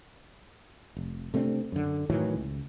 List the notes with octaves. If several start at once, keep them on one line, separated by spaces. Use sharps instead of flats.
F1
C3 A3 C4 D4
F#2 D3
A2 D#3 E3 F#3
C#2